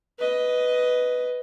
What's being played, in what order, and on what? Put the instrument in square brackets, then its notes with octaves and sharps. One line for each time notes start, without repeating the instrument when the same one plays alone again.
[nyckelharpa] B4 D#5